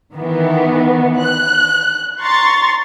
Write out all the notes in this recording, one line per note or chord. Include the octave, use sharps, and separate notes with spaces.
D#3 E3 B3
F#6
A#5 C6 C#6 A6